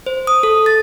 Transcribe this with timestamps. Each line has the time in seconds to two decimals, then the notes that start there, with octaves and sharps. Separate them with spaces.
0.06 C5
0.27 D#6
0.43 A4
0.66 A6